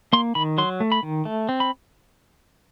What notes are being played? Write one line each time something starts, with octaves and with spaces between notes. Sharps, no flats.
A#3 C6
D#3 B5
F#3 C6
A3
B5
D#3
A3
C4
B5